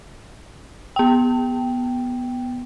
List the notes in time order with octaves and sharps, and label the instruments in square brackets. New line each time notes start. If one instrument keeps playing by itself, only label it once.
[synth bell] B3 G5